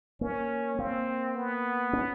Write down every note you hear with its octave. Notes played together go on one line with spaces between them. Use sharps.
A#3 C#4
A#3 C4
B3
C#4